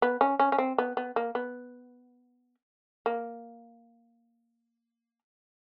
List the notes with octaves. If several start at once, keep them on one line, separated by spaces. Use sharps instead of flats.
B3
C#4
C#4
C#4
C4
B3
B3
A#3
B3
A#3